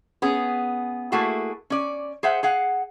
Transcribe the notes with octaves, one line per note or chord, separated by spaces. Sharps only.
B3 C#4 G#4
A3 A#3 E4 F#4 G#4
C#4 D5
G#4 C5 E5 F#5
G#4 F5 F#5